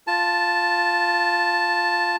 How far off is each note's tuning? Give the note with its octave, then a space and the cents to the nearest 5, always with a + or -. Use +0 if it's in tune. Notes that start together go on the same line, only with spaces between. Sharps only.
F4 +0 A5 +0